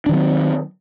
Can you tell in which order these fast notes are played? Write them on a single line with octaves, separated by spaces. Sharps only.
D4 D#3 F#3 C4